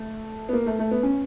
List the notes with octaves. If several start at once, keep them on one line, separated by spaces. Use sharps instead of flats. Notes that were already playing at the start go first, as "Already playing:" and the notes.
Already playing: A3
B3
A#3
A3
A3
B3
C#4